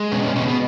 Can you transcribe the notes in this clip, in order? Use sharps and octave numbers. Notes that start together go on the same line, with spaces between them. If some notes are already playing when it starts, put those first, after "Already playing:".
Already playing: G#3
B2 C#4
C#4
B2 C#4
B3